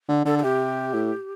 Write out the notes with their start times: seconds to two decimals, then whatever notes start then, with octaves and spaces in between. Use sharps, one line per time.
0.08 D3
0.25 D3 A4
0.39 A4
0.43 C3 G4
0.94 A2